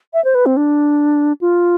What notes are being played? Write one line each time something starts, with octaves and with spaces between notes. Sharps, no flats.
E5
C5
B4
C4
D4
F4